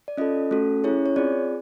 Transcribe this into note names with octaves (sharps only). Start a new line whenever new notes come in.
D5
C#4 F4 A4 D#5
A3 C#4 F#4 A4
C#4 E4 G#4 C#5
C#5
C4 F4 G#4 D5